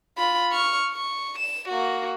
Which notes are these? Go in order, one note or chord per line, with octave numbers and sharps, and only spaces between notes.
F4 B5
C#6 F6
C#6
E7
A#3 F#4